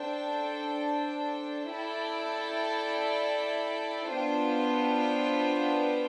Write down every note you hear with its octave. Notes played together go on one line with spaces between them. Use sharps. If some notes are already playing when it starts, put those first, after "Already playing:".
Already playing: D4 A4 C5 G5
E4 A4 D5 G5
B3 D4 F4 C5 G5